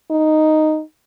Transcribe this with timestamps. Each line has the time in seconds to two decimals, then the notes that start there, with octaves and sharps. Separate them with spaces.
0.11 D#4